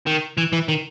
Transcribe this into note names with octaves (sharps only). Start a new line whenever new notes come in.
D#3
E3
E3
D#3